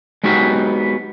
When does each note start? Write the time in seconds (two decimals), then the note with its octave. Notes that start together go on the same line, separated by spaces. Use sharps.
0.24 G#3 B3 D#4 F#4 G4